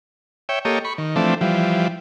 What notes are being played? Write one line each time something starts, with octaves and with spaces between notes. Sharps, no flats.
C#5 E5 G5
A#3 G4 A4 C#5 D#5
B5 C#6
D#3
E3 F3 A3 C4 D4
E3 F3 G3